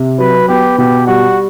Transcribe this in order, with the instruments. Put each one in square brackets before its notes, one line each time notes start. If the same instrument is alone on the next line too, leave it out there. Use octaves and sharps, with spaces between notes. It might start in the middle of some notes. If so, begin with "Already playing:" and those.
Already playing: [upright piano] C3
[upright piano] F#3 [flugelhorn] B4
[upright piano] B3 [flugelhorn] G4
[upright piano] B2 [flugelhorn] G4
[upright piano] G3 [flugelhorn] F#4